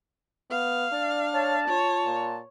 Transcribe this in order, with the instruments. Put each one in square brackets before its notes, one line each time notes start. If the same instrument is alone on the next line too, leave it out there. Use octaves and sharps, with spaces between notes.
[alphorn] B3 [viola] F5
[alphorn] D4 [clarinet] D5
[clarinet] C#5 [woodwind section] A5
[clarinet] F4 [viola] C#5
[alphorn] A#2